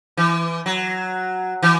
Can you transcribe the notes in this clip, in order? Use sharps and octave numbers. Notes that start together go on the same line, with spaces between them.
E3
F#3
E3